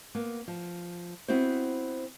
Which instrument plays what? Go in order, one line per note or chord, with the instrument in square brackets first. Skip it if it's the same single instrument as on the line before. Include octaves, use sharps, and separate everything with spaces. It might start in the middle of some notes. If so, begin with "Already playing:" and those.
[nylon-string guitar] A#3 B3
F3
B3 C4 E4 F#4 C5